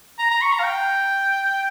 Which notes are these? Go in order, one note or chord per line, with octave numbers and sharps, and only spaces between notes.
A#5
A#5
C#6
A#5
F5
G5